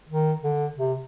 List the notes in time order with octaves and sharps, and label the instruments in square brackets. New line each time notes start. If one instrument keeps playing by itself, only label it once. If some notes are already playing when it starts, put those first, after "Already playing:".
[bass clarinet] D#3
D3
C3